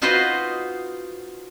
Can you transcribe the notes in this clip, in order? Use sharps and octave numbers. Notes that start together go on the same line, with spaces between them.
D#4 F4 F#4 B4 C5 D#5